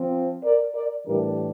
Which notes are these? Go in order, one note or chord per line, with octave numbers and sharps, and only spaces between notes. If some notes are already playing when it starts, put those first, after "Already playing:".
Already playing: F3 C4
A#4 D5
A#4 D5
A2 E3 G3 D4 G4 A#4